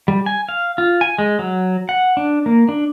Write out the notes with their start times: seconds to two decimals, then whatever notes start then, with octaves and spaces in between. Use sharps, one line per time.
0.08 G3
0.26 G#5
0.49 F5
0.78 F4
1.01 G#5
1.18 G#3
1.39 F#3
1.89 F#5
2.17 D4
2.46 A#3
2.69 D4